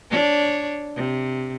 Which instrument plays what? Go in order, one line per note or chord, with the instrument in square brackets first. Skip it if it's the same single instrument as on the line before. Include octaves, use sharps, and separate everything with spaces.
[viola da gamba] D4 C#5
C3